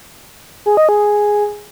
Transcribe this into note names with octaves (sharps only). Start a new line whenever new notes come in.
G#4
D#5
G#4